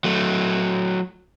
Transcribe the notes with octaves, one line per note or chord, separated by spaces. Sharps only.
F#3 A3